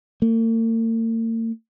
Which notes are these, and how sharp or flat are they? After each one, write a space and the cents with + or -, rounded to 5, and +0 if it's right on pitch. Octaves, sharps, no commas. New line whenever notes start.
A#3 -45